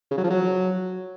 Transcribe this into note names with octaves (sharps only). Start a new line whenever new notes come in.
C#3
F#3
F3
F#3